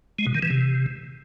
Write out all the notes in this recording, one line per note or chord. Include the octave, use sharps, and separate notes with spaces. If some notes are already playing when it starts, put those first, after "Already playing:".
G#3
B2
D#3
E3
C3